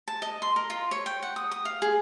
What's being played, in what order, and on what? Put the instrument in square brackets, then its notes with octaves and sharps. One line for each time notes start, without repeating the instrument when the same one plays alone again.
[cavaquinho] A5
D#5
C6
A#4
F4
C#5
G5
F#5
D#6
D#6
F5
G#4